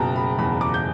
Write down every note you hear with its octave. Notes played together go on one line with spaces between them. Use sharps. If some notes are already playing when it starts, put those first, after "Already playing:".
Already playing: F#1 B2 G5 A5 A#5
B5
E2 B5
D6
G6